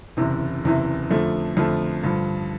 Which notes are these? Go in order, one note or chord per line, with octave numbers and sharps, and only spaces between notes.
F#1 E2 C3 E3
F#1 E2 C3 E3
F2 D3 F3 A3
F2 D3 F3 A3
G2 D3 F3